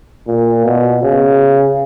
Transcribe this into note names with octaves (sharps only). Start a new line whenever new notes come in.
A#2
B2
C#3